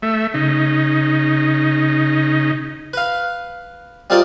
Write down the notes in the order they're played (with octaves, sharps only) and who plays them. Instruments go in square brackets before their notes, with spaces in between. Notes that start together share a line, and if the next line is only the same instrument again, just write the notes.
[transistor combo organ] A3 E5
C#3 D#4
[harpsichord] B4 F5
G3 C4 F4 A#4 D5 D#5